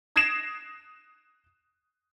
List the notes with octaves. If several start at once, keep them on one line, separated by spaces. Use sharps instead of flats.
D#6 G#6 A#6 C7 D7 E7